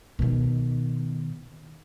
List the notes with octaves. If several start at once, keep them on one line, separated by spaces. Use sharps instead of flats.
B2 D#3